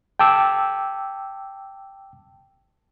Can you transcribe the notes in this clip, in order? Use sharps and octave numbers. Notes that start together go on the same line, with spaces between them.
G5 A5 D6 E6